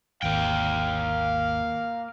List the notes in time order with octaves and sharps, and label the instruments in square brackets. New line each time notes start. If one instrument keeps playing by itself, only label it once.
[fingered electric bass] G#1 D#2 [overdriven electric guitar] A#3 G5 [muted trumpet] F5